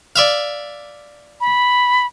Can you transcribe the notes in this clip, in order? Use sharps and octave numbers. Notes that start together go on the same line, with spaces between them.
D5 E5 F5
B5